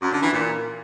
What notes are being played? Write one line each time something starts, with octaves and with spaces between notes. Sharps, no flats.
F#2
D3
E3
A#2